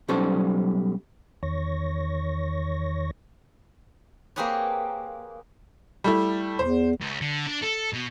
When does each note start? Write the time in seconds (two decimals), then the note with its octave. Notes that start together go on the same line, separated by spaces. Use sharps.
0.08 B1 F#3 G3 C#4 A4 C5
1.43 E2 D#3 C#5 C#6 A#6
4.36 A#3 C4 G4 G#4 B4 C#5
6.04 G3 A3 E4
6.59 E2 C5
7.01 C#2
7.21 D3
7.47 D4
7.62 A4
7.93 B2